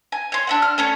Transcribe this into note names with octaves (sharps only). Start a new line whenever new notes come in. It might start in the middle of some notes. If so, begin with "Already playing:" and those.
G#5
C#5 C6
D4 E5 F#5
F6
A3 C#4 C#5